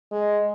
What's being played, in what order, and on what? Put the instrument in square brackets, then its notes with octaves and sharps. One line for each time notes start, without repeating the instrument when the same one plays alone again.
[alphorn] G#3